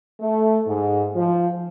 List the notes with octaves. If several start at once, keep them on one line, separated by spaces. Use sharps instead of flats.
A3
G#2
F3